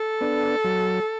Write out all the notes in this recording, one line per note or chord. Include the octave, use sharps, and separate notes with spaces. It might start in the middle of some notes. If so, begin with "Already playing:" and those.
Already playing: A4
B3 D4
F#3